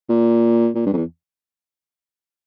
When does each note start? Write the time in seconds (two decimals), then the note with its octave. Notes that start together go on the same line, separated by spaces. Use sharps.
0.09 A#2
0.75 A#2
0.86 G2
0.93 F2
0.97 E2